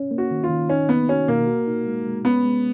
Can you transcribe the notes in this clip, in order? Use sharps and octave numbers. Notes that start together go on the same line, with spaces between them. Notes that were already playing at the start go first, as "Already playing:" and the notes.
Already playing: C#4
A#3
F#4
D#3
F4
D#3
C#4 D#4
A#3 B3
C#4 F#4
B2 A#3
F#4
D#4
G#3
G#3
B3 C#4
G#3